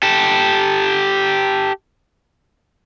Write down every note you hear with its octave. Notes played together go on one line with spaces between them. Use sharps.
G4 A4